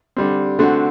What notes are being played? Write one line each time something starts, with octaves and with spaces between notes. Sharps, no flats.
D3 G3 C4
D3 A3 C4 F#4